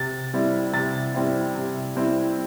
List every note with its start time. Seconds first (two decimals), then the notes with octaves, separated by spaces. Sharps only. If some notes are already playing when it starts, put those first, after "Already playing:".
Already playing: C3 A6
0.34 G3 C4 E4
0.73 C3 A6
1.14 G3 C4 E4
1.55 C3
1.96 G3 C4 E4